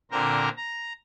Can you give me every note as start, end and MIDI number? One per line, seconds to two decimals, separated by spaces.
0.11 0.49 46
0.11 0.49 50
0.11 0.49 60
0.11 0.49 70
0.11 0.49 72
0.11 0.49 82
0.57 0.93 82